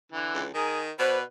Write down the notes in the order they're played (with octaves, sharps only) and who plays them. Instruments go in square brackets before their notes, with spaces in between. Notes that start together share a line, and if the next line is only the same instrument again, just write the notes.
[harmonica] D3 E3
[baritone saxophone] C#2
[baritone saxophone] D#3 [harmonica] G#4 A#4
[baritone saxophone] B2 [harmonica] B4 D5 [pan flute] C5